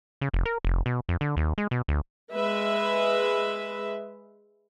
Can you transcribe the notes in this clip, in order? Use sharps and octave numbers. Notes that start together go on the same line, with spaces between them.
C#3
F1
A#4
F1
B2
F2
D3
D#2
G#3
B2
D2
G#3 B4 E5